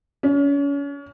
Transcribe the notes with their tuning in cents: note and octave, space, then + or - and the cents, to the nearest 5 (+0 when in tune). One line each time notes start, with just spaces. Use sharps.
C#4 +35